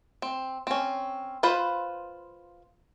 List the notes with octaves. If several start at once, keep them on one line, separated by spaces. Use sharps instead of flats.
C4
C4 C#4
F4 B4 C5 B5